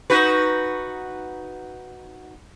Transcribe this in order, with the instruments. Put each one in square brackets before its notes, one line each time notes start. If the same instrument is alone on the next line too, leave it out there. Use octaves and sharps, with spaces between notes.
[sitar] D#4 F#4 B4